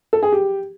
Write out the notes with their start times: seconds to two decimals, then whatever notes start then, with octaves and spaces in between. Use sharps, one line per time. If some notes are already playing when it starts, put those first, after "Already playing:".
0.13 A4
0.23 G#4
0.32 G4